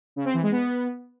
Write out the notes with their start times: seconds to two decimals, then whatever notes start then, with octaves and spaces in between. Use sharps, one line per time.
0.16 C#3
0.25 C4
0.34 E3
0.43 G#3
0.52 B3